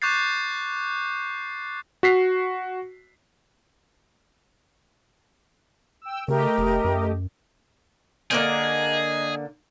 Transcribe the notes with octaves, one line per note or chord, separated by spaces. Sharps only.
C#6 D6 F#6 G6 A6 C7
F#4 B6 C7
G5 E6
C#3 A3 G4 A#4 D#5
F1
F#2
D3 A#3 C4 G#4 D#5